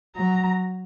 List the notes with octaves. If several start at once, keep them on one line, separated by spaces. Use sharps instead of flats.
F#3 A#5